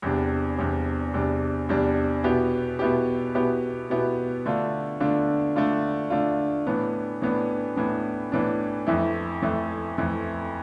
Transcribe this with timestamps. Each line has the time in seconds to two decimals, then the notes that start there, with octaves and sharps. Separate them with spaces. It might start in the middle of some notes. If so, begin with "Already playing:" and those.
0.02 E2 C3 G3 D4
0.57 E2 C3 G3 D4
1.14 E2 C3 G3 D4
1.69 E2 C3 G3 D4
2.24 B2 B3 E4 G4
2.79 B2 B3 E4 G4
3.34 B2 B3 E4 G4
3.90 B2 B3 E4 G4
4.46 D3 A3 D4 F4
5.00 D3 A3 D4 F4
5.55 D3 A3 D4 F4
6.10 D3 A3 D4 F4
6.67 A2 E3 B3 D4
7.21 A2 E3 B3 D4
7.76 A2 E3 B3 D4
8.32 A2 E3 B3 D4
8.87 F2 E3 A3 E4
9.42 F2 E3 A3 E4
9.98 F2 E3 A3 E4